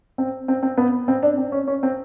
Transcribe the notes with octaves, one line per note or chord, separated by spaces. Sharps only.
C4
C4
C4
B3
C4
D4
C4
C#4
C#4
C4